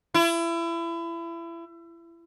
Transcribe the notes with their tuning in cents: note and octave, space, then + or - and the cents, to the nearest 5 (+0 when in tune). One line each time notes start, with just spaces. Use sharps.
E4 +30